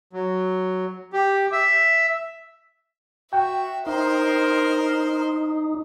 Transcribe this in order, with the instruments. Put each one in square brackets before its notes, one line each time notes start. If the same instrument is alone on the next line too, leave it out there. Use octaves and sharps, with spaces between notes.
[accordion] F#3
G4
E5
[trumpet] F#4 [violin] E5 [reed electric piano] G5
[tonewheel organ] D#4 [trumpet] A#4 [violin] C5 C6